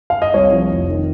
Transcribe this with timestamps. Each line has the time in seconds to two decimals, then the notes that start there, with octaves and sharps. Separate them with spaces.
0.10 F5
0.22 D#5
0.34 C2 C#5
0.52 F3
0.71 F1
0.89 D#3